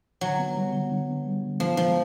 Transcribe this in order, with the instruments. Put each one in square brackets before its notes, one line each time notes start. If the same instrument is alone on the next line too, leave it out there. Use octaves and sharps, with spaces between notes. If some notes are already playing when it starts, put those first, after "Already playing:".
[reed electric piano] D3 [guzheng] F#3
[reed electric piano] B3
G3
D3
D3
B3
G3
D3
[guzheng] F3 [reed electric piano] B3
[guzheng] F3 [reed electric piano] G#3